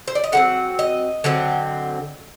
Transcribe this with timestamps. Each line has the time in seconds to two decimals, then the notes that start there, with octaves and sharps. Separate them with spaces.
0.08 C5
0.15 D5
0.24 D#5
0.32 D3 F#3 C4 F#5
0.79 D#5
1.24 D3 F#3 C4